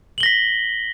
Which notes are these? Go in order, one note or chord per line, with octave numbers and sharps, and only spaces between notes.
A#6 B6 F#7 G7